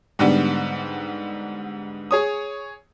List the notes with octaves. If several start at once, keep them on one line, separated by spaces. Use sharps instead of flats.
G#2 D3 G3 B3
G#4 C#5 D#6